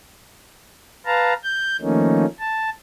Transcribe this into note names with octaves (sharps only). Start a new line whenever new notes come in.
B4 F5 A5 A#5
G6
D#3 F3 A3 A#3 C#4 D#4
A5